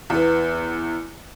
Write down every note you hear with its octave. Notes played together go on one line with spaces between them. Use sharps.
E2 B3